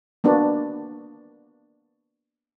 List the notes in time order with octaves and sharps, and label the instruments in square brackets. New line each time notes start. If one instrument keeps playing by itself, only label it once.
[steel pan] A#3 B3 D4 F#4